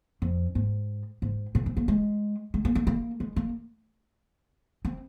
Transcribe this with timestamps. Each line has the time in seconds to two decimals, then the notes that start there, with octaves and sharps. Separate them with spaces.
0.22 F2
0.55 G#2
1.22 G#2
1.55 A#2
1.66 C4
1.77 A#3
1.88 G#3
2.54 G#3
2.65 A#3
2.75 A#3
2.87 A#3
3.20 G#3
3.36 A#3
4.85 C4